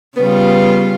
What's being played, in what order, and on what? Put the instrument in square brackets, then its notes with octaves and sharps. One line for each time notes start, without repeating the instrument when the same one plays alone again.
[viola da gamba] C#3 G3 F4 [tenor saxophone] B3